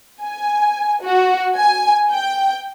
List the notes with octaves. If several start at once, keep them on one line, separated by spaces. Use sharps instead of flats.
G#5
F#4
G#5
G5